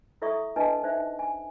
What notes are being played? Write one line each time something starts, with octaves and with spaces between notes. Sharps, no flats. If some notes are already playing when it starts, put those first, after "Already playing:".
E4 A4 D5 E5 C#6 D#6
D4 E4 B4 D#5 G#5 A5
D#4 C5 D5 E5
G#5